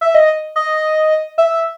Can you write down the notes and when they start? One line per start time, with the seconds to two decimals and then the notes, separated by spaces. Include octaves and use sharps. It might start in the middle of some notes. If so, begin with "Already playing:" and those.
0.01 E5
0.15 D#5
0.56 D#5
1.38 E5